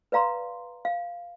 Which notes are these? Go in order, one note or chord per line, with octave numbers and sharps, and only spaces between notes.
B4 D5 F5 A#5 C6
F5